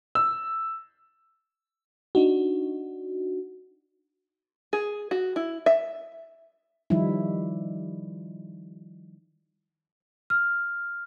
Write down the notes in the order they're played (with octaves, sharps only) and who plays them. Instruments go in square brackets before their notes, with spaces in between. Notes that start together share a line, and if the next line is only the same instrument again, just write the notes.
[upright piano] E6
[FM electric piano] D4 D#4 F#4
[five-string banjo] G#4
F#4
E4
E5
[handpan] D#3 F3 G3 D#4 E4
[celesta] F6